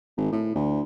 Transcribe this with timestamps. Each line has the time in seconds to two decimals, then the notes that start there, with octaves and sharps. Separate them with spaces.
0.17 G#1
0.32 A2
0.55 D2